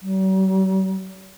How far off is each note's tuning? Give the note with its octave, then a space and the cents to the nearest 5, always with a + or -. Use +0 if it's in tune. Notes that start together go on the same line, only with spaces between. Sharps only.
F#3 +45